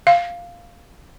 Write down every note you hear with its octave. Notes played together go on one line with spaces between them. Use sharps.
F5